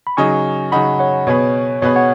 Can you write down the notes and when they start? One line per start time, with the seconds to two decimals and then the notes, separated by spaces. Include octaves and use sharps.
0.07 B5
0.17 C#3 F#3 D#4 G#5 C#6
0.72 C#3 F#3 D#4 F#5 B5
0.99 C#5 F#5
1.27 B2 B3 G#4 B4 C#5
1.82 B2 B3 G#4 B4 C#5
1.96 C#5 F#5